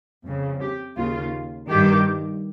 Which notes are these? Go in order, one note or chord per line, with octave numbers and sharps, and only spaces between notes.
F2 C#3
G4
D#2 C#3 F4
G2 D#3 G4